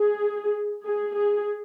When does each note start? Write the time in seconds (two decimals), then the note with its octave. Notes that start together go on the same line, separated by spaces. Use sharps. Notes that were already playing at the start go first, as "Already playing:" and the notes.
Already playing: G#4
0.84 G#4
1.16 G#4